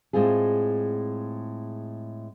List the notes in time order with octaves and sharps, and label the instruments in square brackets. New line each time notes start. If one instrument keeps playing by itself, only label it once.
[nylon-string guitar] A2 G#3 C4 F4 G#4